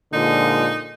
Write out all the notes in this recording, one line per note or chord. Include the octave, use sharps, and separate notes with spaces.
A#2 D3 F3 G#3 D#4